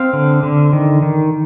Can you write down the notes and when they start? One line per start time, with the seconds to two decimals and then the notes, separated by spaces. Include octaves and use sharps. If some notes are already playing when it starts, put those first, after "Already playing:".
Already playing: C4 F5
0.13 D3
0.43 D3
0.73 D#3
1.03 D#3